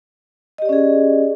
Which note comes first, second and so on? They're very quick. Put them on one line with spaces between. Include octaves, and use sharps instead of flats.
D#5 G4 D5 C#4 G#4